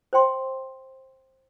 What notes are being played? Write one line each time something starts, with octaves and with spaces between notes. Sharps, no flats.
C5 G5 C6